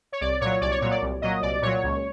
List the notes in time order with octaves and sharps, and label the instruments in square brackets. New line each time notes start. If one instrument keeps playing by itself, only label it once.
[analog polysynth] C#5
C2 D5
A#2 F#3 C#5
C2 D5
C#5
A#2 F#3 C#5
D5
C2
A#2 F#3 D#5
C2 D5
A#2 F#3 C#5
C#2